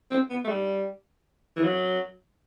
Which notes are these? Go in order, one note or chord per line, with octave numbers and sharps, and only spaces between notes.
C4
B3
A3
G3
E3
F#3